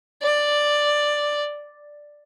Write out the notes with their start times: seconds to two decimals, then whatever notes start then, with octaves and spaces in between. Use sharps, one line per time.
0.22 D5